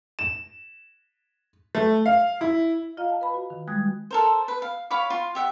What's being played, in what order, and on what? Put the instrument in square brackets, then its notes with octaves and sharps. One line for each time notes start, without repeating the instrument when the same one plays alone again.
[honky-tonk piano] E7
A3
F5
E4
[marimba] F4 D#5 F5 A#5
A5
B4 B5
F#4
D#3
G3 G#3 D#6 F#6 G#6
[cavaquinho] A4 A#4 C5
B4
F5
C#5 F5 B5 D6
F4 F5
G4 E5 F#5